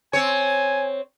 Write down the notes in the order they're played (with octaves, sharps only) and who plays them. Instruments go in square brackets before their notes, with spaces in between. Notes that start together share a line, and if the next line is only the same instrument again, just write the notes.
[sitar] C4 C#5 [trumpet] G#5